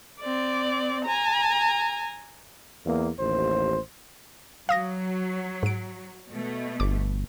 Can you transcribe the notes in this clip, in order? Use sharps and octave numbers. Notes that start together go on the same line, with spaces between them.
C4 D5
G#5 A#5
E2 A#3
A1 D#2 C5
F#3 F5 D#6 A#6
G#2 D7
B2 A3
G1 D6